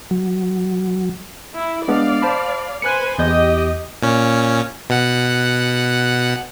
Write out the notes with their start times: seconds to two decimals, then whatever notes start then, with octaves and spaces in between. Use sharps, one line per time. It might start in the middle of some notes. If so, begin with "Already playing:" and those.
0.11 F#3
1.55 E4
1.88 G#3 B3 D4 D5 F5
2.22 C5 A5 B5
2.82 B4 C5 G#5 F#6 C#7
3.18 E2 G4 D#5 G6
4.03 A#2 C#4
4.90 B2 F#5